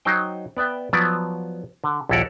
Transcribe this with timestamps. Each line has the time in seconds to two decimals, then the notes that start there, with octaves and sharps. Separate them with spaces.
0.05 F#3 D#4 C5 G5
0.57 B3 D5 E5 G5
0.93 F3 F#3 B3 D5
1.84 D3
2.09 A#1 D#2 E4 A4 A#4 F#5